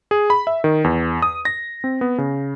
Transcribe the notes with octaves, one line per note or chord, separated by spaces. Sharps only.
G#4
B5
E5
D#3
E2
D#6
A#6
C4
B3
C#3